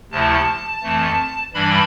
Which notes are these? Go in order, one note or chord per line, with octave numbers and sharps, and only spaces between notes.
D2 C3 F3 A3 E4 A5
F2 E3 A3
G2 E3 G3 D4 B5